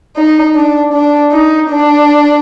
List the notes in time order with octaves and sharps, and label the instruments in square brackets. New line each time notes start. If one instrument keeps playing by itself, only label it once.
[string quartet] D#4
D4
D4
D#4
D4